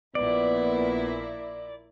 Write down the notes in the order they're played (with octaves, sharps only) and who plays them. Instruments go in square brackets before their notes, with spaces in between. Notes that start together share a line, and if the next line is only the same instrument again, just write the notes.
[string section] A#1 A#2 E4 [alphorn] B3 [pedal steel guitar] D5